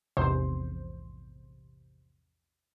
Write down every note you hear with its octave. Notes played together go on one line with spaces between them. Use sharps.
A#1 E2 G#2 C3 C5